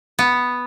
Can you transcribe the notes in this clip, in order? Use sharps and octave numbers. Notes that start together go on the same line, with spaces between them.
B3